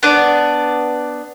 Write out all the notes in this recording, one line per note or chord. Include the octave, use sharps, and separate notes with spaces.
B3 D4 D5